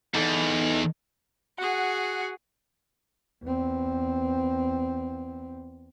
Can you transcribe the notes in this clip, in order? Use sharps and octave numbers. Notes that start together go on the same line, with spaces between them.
E2 D#4 A4
F#4 G#4 F#5
E2 C4